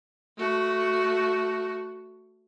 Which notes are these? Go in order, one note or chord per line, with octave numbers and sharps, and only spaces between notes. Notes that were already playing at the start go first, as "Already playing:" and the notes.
A3 F#4